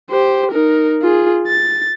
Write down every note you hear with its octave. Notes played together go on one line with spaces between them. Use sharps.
G4 C5
D#4 A#4
F4 G#4
A6